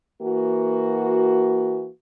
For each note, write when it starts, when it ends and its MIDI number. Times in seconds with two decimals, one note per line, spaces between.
0.22 1.89 52
0.22 1.89 58
0.22 1.89 66